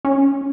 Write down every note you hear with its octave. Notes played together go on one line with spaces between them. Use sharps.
C#4